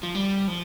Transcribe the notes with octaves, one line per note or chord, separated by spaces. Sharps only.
F3
G3
F3